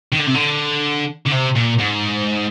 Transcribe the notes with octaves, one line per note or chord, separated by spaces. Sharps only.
D#3
D3
C3
D3
D3
C3
A#2
G#2